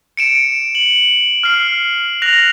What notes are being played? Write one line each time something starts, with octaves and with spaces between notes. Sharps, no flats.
C#7 D7 E7
F#7
F6 C7
F#6 A#6 F7